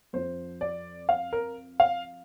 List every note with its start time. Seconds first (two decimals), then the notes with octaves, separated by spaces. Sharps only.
0.13 F2 F3 C5
0.61 D5
1.09 F5
1.33 A#4
1.80 F5